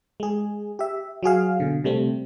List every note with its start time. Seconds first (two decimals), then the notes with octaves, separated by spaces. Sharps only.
0.20 G#3 G#4
0.79 G4 E5
1.23 F#3 F#4 G#4 F5
1.60 B2 D3
1.84 C3 G3 A3 C4